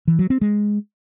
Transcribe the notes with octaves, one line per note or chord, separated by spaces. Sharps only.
E3
F#3
C4
G#3